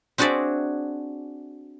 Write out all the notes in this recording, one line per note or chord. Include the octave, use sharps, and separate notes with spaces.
C4 D4 F#4 G#4 D5 E5